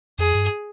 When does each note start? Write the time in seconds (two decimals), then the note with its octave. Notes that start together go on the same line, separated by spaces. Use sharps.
0.19 F2 G#4
0.35 G2